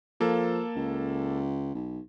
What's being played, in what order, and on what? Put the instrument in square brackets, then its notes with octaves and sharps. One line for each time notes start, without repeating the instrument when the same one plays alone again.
[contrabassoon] F3 [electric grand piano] A#3 A4
[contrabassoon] C#2
B1